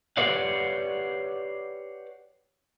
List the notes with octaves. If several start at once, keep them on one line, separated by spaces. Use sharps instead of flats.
G4 B4 C#5 D5 F5 F#5